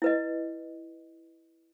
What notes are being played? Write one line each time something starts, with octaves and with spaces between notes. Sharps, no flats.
E4 B4 D#5